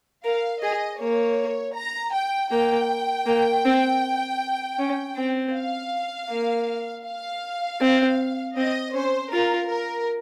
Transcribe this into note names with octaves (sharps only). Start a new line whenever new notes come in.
A#4 F5
G#4 D#5
A#3 C#5
A#5
G5
A#3 G5
A#3
C4
C#4
C4
F5
A#3
F5
C4
C4 D#5
C#4 C5
F4 A#4
A#4